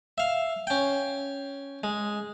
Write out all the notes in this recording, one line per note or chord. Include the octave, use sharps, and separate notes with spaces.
E5 F5
C#4 G5
G#3